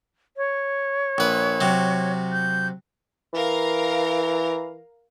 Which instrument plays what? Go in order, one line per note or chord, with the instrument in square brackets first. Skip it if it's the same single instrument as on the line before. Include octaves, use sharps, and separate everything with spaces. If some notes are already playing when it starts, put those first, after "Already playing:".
[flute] C#5
[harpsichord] A#1 B4
C3 F#3
[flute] G6
[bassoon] E3 [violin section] A#4 F5 A#5